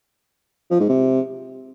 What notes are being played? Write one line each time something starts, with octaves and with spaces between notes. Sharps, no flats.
F3
G#2
C3